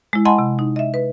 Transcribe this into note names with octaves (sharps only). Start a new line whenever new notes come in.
G#3 E4
D#5 F#5 G#5 A5 B5 C6
C3
D#4
D#5 E5
B4